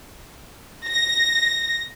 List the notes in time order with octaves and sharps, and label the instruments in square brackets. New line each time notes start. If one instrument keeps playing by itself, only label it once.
[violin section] A#6